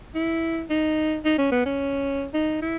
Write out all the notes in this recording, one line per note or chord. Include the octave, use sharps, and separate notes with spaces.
E4
D#4
D#4
C#4
B3
C#4
D#4
E4